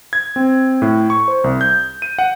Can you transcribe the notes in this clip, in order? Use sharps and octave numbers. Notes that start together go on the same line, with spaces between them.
G#6
C4
A2
C#6
C5
C2
G6
D#7
F#5